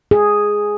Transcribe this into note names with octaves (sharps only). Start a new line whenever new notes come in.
G#4